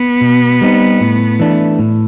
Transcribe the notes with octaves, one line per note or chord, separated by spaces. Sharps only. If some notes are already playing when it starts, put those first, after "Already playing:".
Already playing: B3
B2
G3 C4 D#4
A2
E3 A3 D4
A2